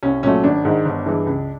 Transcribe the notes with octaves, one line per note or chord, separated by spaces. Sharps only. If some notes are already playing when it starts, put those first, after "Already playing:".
C2 C#4
A#2 F#3 A3 C#4
G#1 D4
G#2 D#3
G1
G2 E3 G#3
C#2